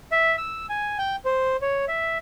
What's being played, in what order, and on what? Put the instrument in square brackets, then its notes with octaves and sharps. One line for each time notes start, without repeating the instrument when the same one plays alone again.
[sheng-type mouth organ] E5
E6
G#5
G5
C5
C#5
E5